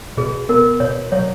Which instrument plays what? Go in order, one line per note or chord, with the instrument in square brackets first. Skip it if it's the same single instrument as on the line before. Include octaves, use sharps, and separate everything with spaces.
[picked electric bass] B2 [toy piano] G#4
[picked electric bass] B3 [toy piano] A#4
[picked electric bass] B2 [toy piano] C#5
[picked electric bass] F#3 [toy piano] C#5